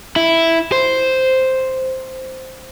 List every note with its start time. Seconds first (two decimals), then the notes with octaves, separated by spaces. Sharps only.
0.16 E4
0.72 C5